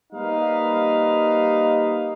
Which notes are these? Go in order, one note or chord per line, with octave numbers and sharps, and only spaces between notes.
G3 A#3 D#4 B4 F5